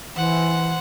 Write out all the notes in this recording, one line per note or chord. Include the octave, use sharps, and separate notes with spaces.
E3 C5 F#5